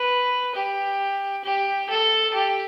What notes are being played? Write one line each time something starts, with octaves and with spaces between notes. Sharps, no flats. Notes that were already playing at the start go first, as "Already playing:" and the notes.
Already playing: B4
G4
G4
A4
G4